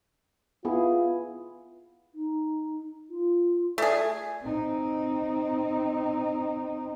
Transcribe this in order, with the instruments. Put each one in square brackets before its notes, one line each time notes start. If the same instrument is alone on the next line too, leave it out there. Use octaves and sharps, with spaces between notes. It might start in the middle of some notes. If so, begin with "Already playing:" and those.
[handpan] B3 E4 G#4 [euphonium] F4
[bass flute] D#4
F4
[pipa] A3 G#4 [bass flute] D5
[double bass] C4 D#4